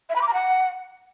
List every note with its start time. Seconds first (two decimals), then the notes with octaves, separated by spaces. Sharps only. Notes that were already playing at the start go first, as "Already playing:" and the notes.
0.09 E5
0.15 B5
0.21 D6
0.27 A#5
0.33 F#5